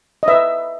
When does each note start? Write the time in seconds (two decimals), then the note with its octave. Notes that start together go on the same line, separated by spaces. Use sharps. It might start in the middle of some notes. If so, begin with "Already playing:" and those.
0.23 D#5
0.28 B4 E5